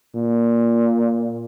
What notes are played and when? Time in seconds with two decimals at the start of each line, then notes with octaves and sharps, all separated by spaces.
0.15 A#2